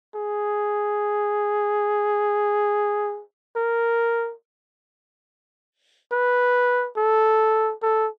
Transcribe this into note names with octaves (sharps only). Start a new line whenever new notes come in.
G#4
A#4
B4
A4
A4